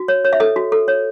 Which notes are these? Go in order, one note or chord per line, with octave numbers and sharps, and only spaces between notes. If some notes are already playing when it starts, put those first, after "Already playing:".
Already playing: F#4
C#5
C#5
E5
A4 D#5
F#4
A4
C#5